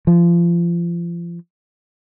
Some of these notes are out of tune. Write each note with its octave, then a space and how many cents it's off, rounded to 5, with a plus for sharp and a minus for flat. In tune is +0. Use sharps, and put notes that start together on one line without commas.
F3 -30